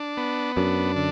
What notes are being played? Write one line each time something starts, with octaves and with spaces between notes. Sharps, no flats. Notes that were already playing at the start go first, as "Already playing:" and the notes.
Already playing: D4
B3
F#2 D4
D3